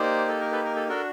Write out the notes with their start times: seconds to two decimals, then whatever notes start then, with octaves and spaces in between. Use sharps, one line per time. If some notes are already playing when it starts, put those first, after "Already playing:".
Already playing: A#3 D#4 G4 C5 D5
0.28 A4
0.40 A#4
0.52 A4 B4
0.64 A#4
0.76 A4
0.89 D4 F#4 A4 A#4